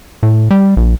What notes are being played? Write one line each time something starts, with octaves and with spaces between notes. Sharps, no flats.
A2
G3
A#1